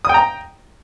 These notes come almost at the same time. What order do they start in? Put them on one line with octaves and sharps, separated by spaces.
D#6 G5 A#5